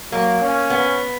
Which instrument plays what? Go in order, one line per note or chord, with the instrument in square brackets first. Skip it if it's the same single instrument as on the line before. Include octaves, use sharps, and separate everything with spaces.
[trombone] F#3 [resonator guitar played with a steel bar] A#3
[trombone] C#4
[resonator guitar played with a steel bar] B3